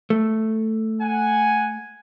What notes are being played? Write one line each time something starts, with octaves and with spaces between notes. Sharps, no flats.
A3
F#5 G#5